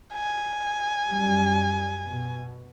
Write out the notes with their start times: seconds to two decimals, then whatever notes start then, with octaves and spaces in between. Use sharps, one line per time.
0.14 G#5
1.08 F#2 G3
2.06 B2